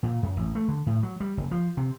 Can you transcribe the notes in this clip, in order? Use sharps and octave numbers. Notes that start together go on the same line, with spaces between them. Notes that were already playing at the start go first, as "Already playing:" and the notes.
A#2
F#2
A1
A3
D3
A2
F#3
G3
F#1
F3
C3